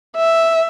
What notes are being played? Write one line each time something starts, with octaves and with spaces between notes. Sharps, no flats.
E5